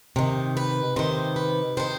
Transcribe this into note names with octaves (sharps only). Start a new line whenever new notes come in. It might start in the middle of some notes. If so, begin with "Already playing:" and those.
C3 D#3
B4
C3 D#3 C5
B4
C3 D#3 C5